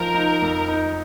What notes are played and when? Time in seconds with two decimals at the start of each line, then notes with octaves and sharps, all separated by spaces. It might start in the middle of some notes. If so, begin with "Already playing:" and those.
Already playing: F3 D#4 A#4
0.15 D#4
0.42 F2
0.68 D#4